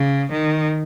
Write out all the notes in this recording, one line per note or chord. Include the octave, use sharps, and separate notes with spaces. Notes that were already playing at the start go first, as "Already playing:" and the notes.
Already playing: C#3
D#3